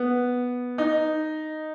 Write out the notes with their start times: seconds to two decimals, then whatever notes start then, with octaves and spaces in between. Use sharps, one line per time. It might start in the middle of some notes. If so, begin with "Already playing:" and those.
Already playing: B3
0.78 D#4